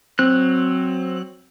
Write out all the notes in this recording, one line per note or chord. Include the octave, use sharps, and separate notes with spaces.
F#3 C4 F#6